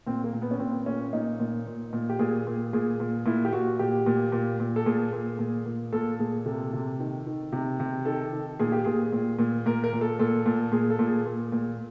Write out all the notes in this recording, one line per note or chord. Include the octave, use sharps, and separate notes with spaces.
A#2 C4
A#3
A#2
B3
C#4
A#2 C4
A#2 C#4
A#2 D#4
A#2
A#2
A#2
G4
A#2 G#4
A#2
A#2 G#4
A#2
A#2 E4
G4
A#2 F#4
A#2 G4
A#2
A#2
A#2
A4
A#2 G#4
A#2
A#2
A#2
A#2 A4
A#2 G#4
C3 A4
C3
D#3
D#3
C3
C3
D#3 A4
D#3
A#2 G#4
G4
A#2 G#4
A#2
A#2
A#2 A#4
A#4
A#2
A4
A#2 A4
A#2
A#2 G#4
A4
A#2
G#4
A#2
A#2